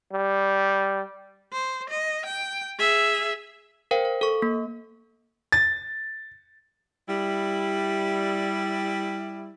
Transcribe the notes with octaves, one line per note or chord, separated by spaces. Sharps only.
G3
C5
D#5
G5
G#4 E5
A#4 C5 F5 G5
F5
A4 C#6
A#3
A6
G3 E4